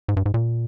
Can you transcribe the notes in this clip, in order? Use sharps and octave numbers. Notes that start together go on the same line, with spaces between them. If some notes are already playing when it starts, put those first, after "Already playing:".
G#2
G2
G#2
A#2